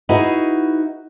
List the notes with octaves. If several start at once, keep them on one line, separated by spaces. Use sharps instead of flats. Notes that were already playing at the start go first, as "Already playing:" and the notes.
D#4 E4 F#4 G#4 B4 D#5